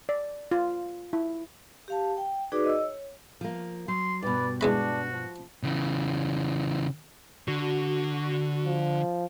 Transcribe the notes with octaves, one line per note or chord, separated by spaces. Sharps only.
D5
F4
E4
G4 F5 A5
G5
D#4 F#4 G#4 B4 D5 D6
D#5 E6
C#5
F3 A#3
F#3 C6
G2 B2 B4 D5
E2 G#3 D4 F#4 B5
F3
C#3 E3
D3 F#4
F3